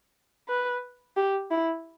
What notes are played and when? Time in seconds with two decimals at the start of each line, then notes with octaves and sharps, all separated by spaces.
0.48 B4
1.17 G4
1.51 E4